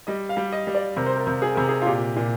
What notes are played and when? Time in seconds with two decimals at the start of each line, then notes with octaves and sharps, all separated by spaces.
0.07 G3 D#5
0.29 F5
0.37 G3
0.52 D#5
0.67 G3
0.75 D5
0.96 C3 A#4
1.06 C5
1.16 A#4
1.27 C3
1.42 G#4
1.55 C3 A#4
1.69 G#4
1.82 F4
1.86 A#2 G4
2.16 A#2